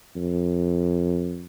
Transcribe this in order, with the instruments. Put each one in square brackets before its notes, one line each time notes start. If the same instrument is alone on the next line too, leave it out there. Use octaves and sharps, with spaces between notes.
[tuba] F2